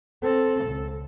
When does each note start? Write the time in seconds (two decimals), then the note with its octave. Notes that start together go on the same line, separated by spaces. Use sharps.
0.22 C4 A4
0.65 C#2